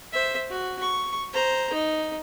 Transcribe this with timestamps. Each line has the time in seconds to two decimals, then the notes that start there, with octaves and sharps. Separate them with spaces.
0.12 C5 E5
0.50 F#4
0.81 C#6
1.33 C5 A#5
1.73 D#4